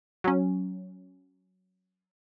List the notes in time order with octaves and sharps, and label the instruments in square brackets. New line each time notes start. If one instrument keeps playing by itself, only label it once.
[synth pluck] F#3 C#4